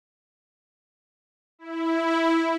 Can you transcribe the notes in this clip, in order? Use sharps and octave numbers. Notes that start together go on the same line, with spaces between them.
E4